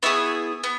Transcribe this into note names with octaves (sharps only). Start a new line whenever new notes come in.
B3 E4 G#4 C#6
B3